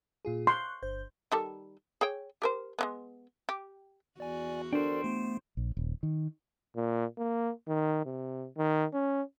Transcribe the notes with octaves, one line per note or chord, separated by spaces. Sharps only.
A#2 F4 G#4
C6 C#6 F#6
G1 C5 G6
D#3 G3 A4
G#4 C#5 G5
G4 A#4 C5
G#3 A#3 B3
G4
E2 F#4 D5 G#5
D4 A4 A#4 C5 D5 G5
A3 B3
A#1
D#1
D#3
A#2
A#3
D#3
C3
D#3
C#4